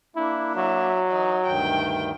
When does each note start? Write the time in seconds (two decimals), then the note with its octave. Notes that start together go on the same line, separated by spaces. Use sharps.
0.16 A#3 D4 E4
0.56 F#3 E5
1.10 E3 D#4
1.46 D2 G2 D#3 G5